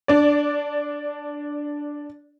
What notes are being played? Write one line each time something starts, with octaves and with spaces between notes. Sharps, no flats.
D4 D5